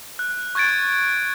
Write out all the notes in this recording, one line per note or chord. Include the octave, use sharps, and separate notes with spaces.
F#6
C#6 F#6 G#6 A6 D7